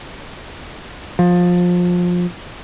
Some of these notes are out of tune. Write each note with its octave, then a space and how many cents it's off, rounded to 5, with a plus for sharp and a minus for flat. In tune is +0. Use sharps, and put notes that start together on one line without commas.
F3 +20